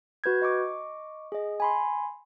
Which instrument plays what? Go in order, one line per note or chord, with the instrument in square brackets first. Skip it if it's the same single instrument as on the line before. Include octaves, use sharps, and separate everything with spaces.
[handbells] F#4 B4 G6 G#6
D#5 C#6 D6
G#4 D#5
G#5 B5 C6